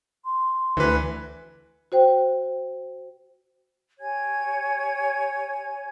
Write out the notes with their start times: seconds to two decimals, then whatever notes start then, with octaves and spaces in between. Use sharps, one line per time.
0.25 C6
0.77 D2 E3 B4
1.92 F#4 C5 G5
3.99 G4 C#5 G#5 G#6